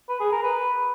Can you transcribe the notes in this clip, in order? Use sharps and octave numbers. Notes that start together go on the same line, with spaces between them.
B4
G#4
A#4
B4